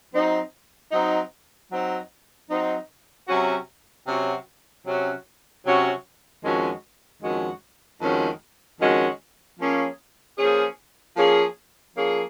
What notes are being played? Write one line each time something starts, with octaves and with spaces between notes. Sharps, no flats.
F#3 C4 D#4
F#3 C4 D#4
F#3 C4 D#4
F#3 C4 D#4
C3 F#3 C#4 F#4
C3 F#3 C#4 F#4
C3 F#3 C#4 F#4
C3 F#3 C#4 F#4
F2 D#3 G#3 C#4 F#4
F2 D#3 G#3 C#4 F#4
F2 D#3 G#3 C#4 F#4
F2 D#3 G#3 C#4 F#4
F3 A#3 C#4 G#4
F3 A#3 C#4 G#4
F3 A#3 C#4 G#4
F3 A#3 C#4 G#4